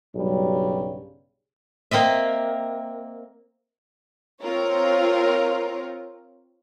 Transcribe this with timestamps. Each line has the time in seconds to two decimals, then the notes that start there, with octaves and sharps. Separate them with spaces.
0.15 B1 G2 C#3 F#3 G3
1.91 A#3 C4 D#5 E5
4.42 C4 F4 A#4 C#5